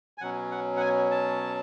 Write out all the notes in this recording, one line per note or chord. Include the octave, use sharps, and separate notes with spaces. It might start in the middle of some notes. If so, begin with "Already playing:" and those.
G#5
B2 F#3 C#4 F#5
F#5
F#5
G#5
A5